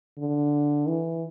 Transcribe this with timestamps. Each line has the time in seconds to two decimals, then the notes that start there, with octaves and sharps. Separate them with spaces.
0.18 D3
0.88 E3